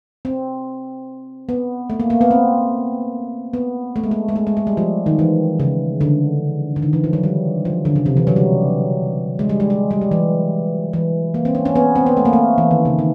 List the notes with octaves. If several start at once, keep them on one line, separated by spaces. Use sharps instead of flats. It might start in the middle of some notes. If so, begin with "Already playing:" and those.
C4
B3
A3
A#3
A#3
B3
C4
B3
A3
G#3
A3
G#3
A3
G#3
G#3
G3
F3
D#3
E3
C#3
D3
D3
D#3
E3
F3
F#3
G3
F3
D3
C#3
C3
E3
F#3
G3
G#3
G3
G#3
G#3
G3
F#3
E3
E3
A#3
C4
C#4
C#4
B3
C4
B3
A3
A#3
A3
E3
D#3
C#3
D#3